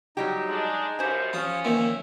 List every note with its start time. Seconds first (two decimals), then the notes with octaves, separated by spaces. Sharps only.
0.17 F#3 G3 D#4 G4
0.47 G#3 D4
0.99 F#2 B2 F3 G4 C5 G#5
1.33 F3 C#4 F4 D#6
1.65 A#2 D#3 F3 E5